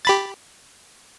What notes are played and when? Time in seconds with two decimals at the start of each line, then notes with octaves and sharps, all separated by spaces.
0.05 G4 B5 A6